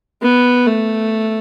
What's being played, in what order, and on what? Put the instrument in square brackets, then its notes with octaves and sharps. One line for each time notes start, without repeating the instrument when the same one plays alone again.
[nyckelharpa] B3
A3